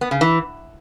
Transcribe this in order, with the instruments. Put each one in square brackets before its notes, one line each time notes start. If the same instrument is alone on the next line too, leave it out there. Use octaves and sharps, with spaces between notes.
[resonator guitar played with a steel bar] B3
C#3
E3